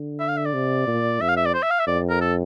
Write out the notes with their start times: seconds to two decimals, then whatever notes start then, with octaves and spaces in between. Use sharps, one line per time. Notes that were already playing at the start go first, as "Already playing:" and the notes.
Already playing: D3
0.19 E5
0.28 F5
0.37 E5
0.46 D5
0.54 C3
0.87 A#2
1.20 F2 E5
1.28 F5
1.37 E5
1.46 D5
1.54 C5
1.62 E5
1.71 F5
1.79 E5
1.87 F2 D5
2.10 A#4
2.21 A4